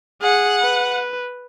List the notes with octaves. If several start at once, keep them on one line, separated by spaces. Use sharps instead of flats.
G#4 F#5
B4